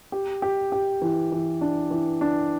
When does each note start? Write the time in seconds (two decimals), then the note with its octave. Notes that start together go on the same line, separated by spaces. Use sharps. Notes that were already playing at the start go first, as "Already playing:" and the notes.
0.12 G4
0.42 G4
0.72 G4
1.02 E3
1.32 E3
1.61 D4
1.91 E3
2.21 D4